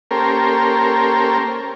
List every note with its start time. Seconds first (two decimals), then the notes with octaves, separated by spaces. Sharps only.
0.11 A#3 C#4 G4 A4 A#4 C5